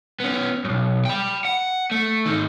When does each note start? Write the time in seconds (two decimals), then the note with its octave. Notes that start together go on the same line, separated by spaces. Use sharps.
0.20 B3 C#4
0.64 B1 F#2
1.05 G5 B5
1.45 F#5
1.91 A3
2.26 G#2 D#3